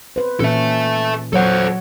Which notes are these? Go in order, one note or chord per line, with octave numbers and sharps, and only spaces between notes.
B4 C5
A#2 E3 C#4 A4 E5
F#3 A4 C5 C#5 F#5